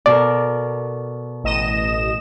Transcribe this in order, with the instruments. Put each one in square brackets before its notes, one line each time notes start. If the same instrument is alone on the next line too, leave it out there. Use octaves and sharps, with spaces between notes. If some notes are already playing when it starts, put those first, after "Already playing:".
[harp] B2 A4 A#4 [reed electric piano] D5
[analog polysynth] A1 D#5 E7